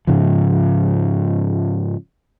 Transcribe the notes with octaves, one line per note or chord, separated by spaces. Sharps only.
G#2 C#3 F3